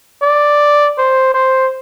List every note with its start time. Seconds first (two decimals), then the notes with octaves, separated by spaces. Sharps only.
0.22 D5
0.98 C5
1.34 C5